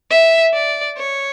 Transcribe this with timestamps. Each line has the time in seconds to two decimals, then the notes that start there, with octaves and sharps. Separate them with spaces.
0.10 E5
0.54 D5
0.98 C#5